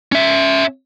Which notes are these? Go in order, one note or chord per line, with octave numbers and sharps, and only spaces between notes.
C#4 E5